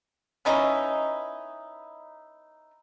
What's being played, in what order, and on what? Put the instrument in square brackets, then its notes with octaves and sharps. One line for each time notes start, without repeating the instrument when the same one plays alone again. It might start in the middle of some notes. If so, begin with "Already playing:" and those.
[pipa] B3 C#4 D#4 E4